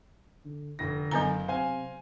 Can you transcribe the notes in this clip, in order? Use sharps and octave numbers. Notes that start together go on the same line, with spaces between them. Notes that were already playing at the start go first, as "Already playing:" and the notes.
D3
F1 D3 A#6
F#1 F#3 B3 A#5 G6
C3 C5 F5 G#5